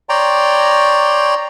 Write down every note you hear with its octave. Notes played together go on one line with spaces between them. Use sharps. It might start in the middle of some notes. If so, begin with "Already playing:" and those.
C#5 D5 G5 A#5 C6